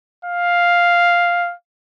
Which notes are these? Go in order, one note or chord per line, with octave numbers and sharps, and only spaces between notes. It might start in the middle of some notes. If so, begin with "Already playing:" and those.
F5